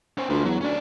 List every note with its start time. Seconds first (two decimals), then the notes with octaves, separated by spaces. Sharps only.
0.18 C#4 C5
0.30 D2 F4 B4
0.44 E2 F#3
0.61 D2 C#4 D5